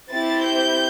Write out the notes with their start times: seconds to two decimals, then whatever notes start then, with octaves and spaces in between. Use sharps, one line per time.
0.12 C4 E4 G4 A6
0.46 G6